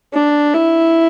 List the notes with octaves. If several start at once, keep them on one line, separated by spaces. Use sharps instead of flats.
D4
E4